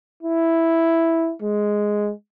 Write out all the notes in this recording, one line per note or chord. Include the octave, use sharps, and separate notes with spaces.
E4
G#3